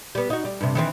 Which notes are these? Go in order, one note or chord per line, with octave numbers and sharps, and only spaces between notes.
G3 B3
D#4 F#4
G3
G2 C3
D#3 E3 C4